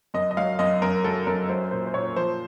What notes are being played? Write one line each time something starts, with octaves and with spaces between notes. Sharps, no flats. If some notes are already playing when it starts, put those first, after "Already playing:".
F#2 D#5
D#5
F#3 F5
F#2 D#5
F#2 A#4
F#3 A4
F#2 A#4
F#3 C5
A#2 C5
C5
A#2 C#5
F3 C5